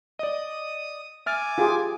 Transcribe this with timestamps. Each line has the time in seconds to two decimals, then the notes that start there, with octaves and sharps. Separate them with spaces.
0.19 D5 D#5 D#6
1.26 E5 G#5 D6 F6 A6
1.58 F4 G4 G#4